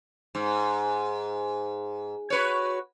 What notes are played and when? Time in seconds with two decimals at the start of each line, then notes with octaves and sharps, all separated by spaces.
0.35 G#2
2.30 F#4 B4 C#5